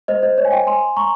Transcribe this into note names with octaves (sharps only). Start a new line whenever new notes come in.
C5 D#5
C5 D#5
C#5
G#5
D#5 G5
G#5 C6
A#5 C#6